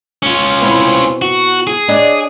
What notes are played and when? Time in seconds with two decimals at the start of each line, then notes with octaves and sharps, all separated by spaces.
0.23 C#4 F4
0.62 B2 C4 E4
1.22 F#4
1.67 G#4
1.88 D4 C#5 D#5